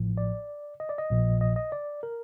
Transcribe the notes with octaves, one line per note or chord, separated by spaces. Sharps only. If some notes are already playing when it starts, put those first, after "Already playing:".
Already playing: A1 A2 F3
D5
D#5
D5
D#5
A#1 A#2 F3
D#5
D#5
D5
A#4